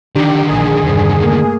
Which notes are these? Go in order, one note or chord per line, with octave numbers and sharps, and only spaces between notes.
D3 D#3 D4 G4
A#1 G#4
E2 G2 C3
A3 A#3